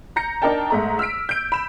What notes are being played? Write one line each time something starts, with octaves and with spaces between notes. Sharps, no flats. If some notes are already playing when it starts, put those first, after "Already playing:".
A#5 G6 A#6 C#7
D4 D#4 A#4 G5 A5
G#2 A3 A#5
E6 F6 B6 D7
G6 D7
B5 E7